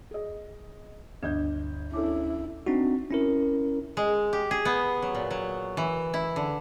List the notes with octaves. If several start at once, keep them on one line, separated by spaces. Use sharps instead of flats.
G#4 D#5
G1 D2 D4 D#5 G6 G#6
C#4 D4 E4 A4 D6
C4 D4 D#4 F#4
C#4 E4 A#4
G#3
G4
G#4
B3
F#3
A#2
F#3
E3
E4
D3